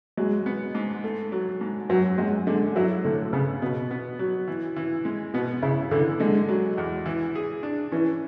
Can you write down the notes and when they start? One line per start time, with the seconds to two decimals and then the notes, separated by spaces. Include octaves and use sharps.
0.17 F#3 G#3
0.46 B3
0.75 G#2
1.04 A3
1.32 F#3
1.61 G#2
1.90 F#2 F#3
2.18 F#2 G#3
2.47 D3 G#3
2.76 F#3 E4
3.04 A2 D3
3.33 C#3 B3
3.62 B2 B3
3.91 B3
4.19 F#3
4.48 E3
4.76 E3
5.05 G#3
5.34 B2 B3
5.62 C#3 E4
5.91 D3 E3
6.20 D3 G#3
6.48 F#3
6.78 E2
7.06 E3
7.35 G#4
7.63 D4
7.92 E3 C#4